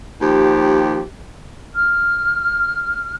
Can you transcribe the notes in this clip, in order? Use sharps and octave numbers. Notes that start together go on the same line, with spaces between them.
D#2 F3 G4
F6